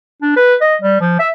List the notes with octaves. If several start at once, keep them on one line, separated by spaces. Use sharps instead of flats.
D4
B4
D#5
G3
F3
E5